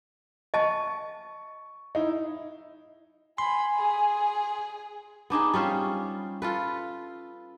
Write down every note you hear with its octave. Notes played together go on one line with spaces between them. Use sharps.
D#5 A5 C#6
D#4 E4
G#5 B5 C6
G#4
B3 D4 D#4 G#4
G3 C#4 F4 C5
F4 A4 B4